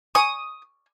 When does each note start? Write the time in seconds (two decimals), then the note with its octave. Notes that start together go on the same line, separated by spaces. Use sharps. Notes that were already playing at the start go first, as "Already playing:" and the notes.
0.15 G#5 C#6 D#6